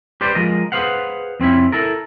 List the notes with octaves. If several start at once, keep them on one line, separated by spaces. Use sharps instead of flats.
G4 B4 C5 D5
F3 G#3 A#4 D#5
G#4 B4 C5 F5 F#5
F2 C4 C#4 E4
E4 A4 A#4